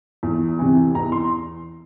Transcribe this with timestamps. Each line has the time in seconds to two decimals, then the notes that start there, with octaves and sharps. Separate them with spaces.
0.23 E2
0.59 C3 E3
0.95 E2 A#5
1.12 C6